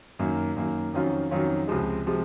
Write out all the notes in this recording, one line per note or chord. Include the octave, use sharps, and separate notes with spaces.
F#2 D#3 A#3
F#2 D#3 A#3
F2 D#3 F#3 C#4 F4
F2 D#3 F#3 C#4 F4
C#2 C3 F3 G#3
C3 F3 G#3